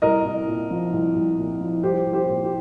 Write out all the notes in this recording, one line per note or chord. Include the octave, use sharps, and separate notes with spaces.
C2 A#4 D#5
C2
A#2
F3
C2
C2
A#2
F3
C2 G4 C5
C2
G4 C5
A#2
G4